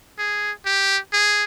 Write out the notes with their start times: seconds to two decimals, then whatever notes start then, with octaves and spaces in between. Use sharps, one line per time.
0.19 G#4
0.66 G4
1.13 G#4